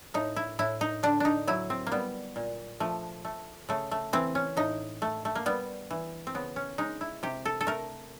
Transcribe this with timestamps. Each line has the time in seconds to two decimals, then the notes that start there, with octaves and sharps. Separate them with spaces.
0.14 A2 D#4
0.36 E4
0.59 A2 E4
0.81 D#4
1.03 D3 D4
1.20 D4 D#4
1.47 F#3 E4
1.70 C4
1.87 A#3
1.92 G3 B3
2.36 A#2
2.80 F3 A3
3.25 A3
3.69 C#3 A3
3.91 A3
4.13 E3 C4
4.35 C#4
4.57 A2 D#4
5.02 A3
5.25 A3
5.35 A#3
5.46 G3 B3
5.91 E3
6.27 C4
6.35 C#3 B3
6.56 C#4
6.78 G#3 D#4
7.01 E4
7.23 C3 G4
7.45 A4
7.61 A4
7.67 A3 A#4